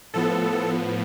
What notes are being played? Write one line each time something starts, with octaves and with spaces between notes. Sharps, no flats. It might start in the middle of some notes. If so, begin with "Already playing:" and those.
A2 F3 B3 A4